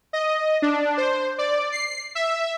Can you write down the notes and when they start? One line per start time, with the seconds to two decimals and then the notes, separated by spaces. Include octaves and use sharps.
0.13 D#5
0.62 D4
0.97 C5
1.38 D5
1.72 C7
2.15 E5